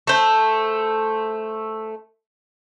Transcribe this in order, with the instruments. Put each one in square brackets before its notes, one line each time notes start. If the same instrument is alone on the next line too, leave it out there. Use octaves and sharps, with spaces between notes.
[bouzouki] A3 C5